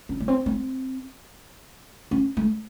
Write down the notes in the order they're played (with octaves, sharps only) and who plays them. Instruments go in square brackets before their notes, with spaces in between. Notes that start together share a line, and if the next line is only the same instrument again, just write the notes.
[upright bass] C#4
B3
C4
C4
C#4
A3